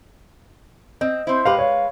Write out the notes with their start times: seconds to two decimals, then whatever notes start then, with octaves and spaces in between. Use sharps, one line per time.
1.01 C4 D#5
1.27 C4 E4 C5
1.45 G#3 G4 B4 F5
1.59 C#5 F5